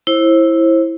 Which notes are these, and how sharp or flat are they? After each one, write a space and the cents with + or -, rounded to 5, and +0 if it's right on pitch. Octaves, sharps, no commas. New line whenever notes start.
E4 +0 C5 +30